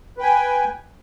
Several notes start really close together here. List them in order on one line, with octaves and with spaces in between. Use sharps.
B4 G5 G#5